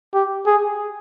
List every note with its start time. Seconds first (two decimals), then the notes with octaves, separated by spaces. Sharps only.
0.14 G4
0.46 G#4